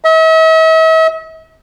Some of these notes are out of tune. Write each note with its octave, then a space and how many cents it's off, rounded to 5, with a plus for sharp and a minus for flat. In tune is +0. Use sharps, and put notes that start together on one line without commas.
E5 -45